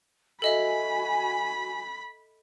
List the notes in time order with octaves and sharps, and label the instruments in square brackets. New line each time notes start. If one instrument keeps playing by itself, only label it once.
[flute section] F#4 G#5 [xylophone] A4 D#5 E5 [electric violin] B5